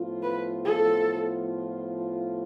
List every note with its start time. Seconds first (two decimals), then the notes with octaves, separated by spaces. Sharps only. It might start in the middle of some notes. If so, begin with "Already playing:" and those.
Already playing: A2 F3 B3 F4
0.23 B4
0.65 A4